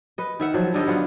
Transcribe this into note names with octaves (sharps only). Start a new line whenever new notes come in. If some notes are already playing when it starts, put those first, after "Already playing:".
B4 D#5
D#3 E5 F#5
F3 F#3
D3 G3 D5 D#5
F#3 B3 F4 F#5